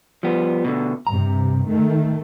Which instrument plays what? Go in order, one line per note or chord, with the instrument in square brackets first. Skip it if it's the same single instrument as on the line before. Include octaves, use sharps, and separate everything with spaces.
[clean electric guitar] F3 G3 B3
B2 D3
[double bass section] G2 C3 [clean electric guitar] A#5
[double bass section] D#3 A3